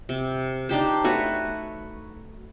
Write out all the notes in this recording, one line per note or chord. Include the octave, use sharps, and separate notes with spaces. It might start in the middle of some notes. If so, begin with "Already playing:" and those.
C3
D4 D#4 G4 C5
A3 F#4 B4 C#5